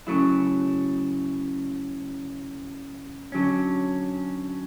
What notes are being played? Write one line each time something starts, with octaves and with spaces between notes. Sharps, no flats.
C#3 F#3 A3 E4
D3 F#3 C#4